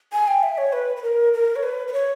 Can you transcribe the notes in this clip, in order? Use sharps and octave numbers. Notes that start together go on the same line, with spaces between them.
G#5
G5
E5
C#5
B4
B4
A#4
A#4
C#5
B4
B4
C#5